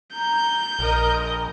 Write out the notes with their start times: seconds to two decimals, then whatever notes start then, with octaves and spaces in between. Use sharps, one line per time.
0.14 A#5 G6
0.79 A#1 A#4 D#5